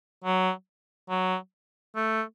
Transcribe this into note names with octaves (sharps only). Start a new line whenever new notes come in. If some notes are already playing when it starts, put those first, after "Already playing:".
F#3
F#3
A3